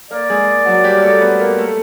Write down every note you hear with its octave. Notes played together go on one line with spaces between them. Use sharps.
A#3 A#4 D5
G#3 G#4
F#3 F#4
G3 G4
A#4
A3 A4
B3 B4
A#3 A#4
A3 A4